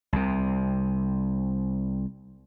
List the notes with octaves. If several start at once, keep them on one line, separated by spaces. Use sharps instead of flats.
C2 C3